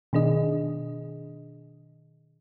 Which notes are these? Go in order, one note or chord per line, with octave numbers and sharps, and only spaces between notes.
B2 D#3 D4 G#4 D#5